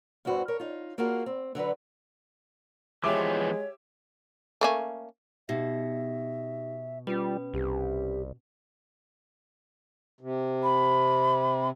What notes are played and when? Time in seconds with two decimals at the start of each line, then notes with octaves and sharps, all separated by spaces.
0.25 E2 G2 E3 F#4 C5
0.48 A#4 C#5
0.60 D#4 F4
0.98 A#3 F4 F#4 G#4 A#4
1.26 C4
1.55 D3 F#3 F#4 B4
3.04 E3 F3 G#3 B3 G4 C#5 E5 D6
4.61 A3 A#3 C#4
5.49 B2 D#4 G4 E5 A#6
7.07 G3 C#4 F4 B4
7.54 C2 G4
10.21 C3
10.63 B5